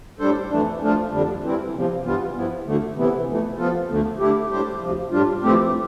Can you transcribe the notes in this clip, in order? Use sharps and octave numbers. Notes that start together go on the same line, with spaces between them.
A2 G3 D4 A4 C5
F2 E3 A3 D4
F3 A3 D4 F4
F2 D3 G3 D4
E3 G3 C4 E4
E2 C3 F3
G2 E3 G3 B3 F4
G2 F3 B3 E4
D2 D3 A3
C3 E3 B3 E4
F2 E3 A3
F3 B3 F4 A4
D2 D3 A3
D3 A3 E4 G4
A2 G3 D4 G4 C5
D2 C3 F3
A2 G3 D4 F4
F2 E3 A3 C4 G4